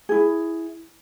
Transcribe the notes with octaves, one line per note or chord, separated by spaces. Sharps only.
E4 G#4